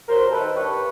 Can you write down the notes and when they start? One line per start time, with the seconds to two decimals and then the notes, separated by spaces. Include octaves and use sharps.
0.08 F#3 A#4 C5
0.25 D#2
0.31 A4 B4
0.39 D#3
0.54 G2 B4 C#5
0.69 G3